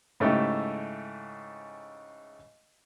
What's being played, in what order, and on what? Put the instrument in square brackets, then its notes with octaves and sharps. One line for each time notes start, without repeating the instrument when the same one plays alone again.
[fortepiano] G#2 C#3 A3 E4 G4